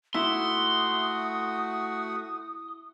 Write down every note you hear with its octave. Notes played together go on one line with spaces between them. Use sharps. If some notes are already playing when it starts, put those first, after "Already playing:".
A3 E4 F#4 F#5 C6 D#6